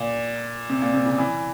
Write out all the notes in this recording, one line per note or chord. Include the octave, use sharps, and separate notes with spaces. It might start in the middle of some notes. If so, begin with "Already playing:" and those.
Already playing: A#2
C3
A#2
C3
C#3
E3